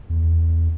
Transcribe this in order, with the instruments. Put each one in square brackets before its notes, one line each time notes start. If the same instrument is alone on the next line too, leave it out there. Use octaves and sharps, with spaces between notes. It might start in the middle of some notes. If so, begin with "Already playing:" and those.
[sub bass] E2